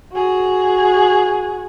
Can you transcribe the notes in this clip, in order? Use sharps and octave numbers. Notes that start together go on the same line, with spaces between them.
F#4 G#4